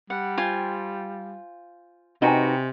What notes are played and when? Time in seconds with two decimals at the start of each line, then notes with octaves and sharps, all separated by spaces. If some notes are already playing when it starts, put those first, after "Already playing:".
0.10 G3 F#5
0.38 F4 C5 G5 G#5
2.22 C3 D#4 F#4 B4 D#5 G5 G#5